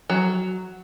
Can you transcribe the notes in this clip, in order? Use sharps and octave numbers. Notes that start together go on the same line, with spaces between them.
F#3